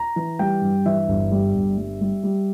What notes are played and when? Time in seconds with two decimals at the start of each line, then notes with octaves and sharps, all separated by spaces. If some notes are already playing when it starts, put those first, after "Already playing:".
Already playing: A#5
0.16 E3
0.39 G3 G5
0.61 G2
0.86 E3 E5
1.08 G1
1.32 G3
1.55 G1
1.78 G3
2.01 G3
2.23 G3